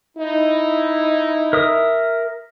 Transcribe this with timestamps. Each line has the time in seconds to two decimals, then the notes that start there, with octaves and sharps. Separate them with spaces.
0.18 D#4 E4
1.53 A#4 E5 D#6